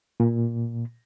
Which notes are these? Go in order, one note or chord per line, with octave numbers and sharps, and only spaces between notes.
A#2